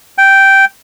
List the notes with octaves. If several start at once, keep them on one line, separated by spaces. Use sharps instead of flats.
G5